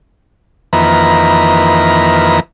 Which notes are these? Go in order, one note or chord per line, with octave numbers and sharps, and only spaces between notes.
F2 D#3 E3 A#3 B4 A#5